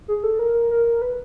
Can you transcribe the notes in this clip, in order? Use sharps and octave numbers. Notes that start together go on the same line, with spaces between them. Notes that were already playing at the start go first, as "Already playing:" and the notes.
G#4
A4
A#4
A#4
B4